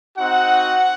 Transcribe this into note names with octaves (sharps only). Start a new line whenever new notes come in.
C4 D#4 F#4 F#5